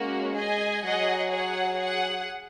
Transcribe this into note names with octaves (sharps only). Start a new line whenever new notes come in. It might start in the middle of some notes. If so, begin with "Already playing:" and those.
Already playing: G#3 A#3 C#4 F#4
G#4 D#5 G#5
F#3 G#4 D#5 F#5
G#4 C#5 F#5
G#4 F#5